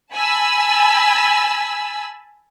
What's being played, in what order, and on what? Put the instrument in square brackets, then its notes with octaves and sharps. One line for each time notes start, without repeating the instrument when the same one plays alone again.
[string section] G#5 A5 B5 E6